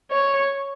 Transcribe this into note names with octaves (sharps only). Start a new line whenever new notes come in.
C#5